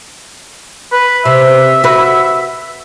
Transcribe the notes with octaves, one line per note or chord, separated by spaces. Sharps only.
B4
C3 E5
F#4 B4